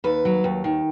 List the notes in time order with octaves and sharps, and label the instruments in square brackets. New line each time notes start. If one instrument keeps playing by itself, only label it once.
[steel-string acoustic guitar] D#2 B4
F#3
D#2
D#3